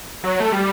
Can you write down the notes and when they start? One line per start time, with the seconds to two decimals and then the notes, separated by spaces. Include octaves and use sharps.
0.24 F#3
0.40 A3
0.52 G3